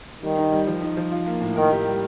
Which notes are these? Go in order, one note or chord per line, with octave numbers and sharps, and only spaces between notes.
D#3 G3
D#4
G3
F3
D#4
F3
F4
A#3
A2
D#3 A#4
G4
G3